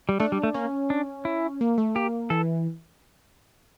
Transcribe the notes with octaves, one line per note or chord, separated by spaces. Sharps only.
G3
A3 D4
G3
A3
A#3 C#4
D4
E4
A#3
A3
A#3 G4
E3 A4